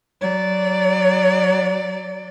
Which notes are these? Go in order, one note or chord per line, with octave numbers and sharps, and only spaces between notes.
F#3 D5